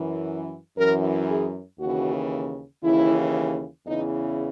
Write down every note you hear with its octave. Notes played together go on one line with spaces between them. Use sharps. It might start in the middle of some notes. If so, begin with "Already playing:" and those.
Already playing: F#2 E3
F#2 E3 A#4
G#4
D#2 C#3 E3 F#4
D#2 C#3 E3 E4
E2 C#3 E3 D#4